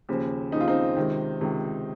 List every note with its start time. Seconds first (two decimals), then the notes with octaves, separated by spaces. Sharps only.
0.09 D#2 C#3 F3
0.52 D#2 C#3 F3 D#4
0.61 F4
0.68 C4 D#4
0.97 C#2 C3 D#3
1.41 C#2 C3 D#3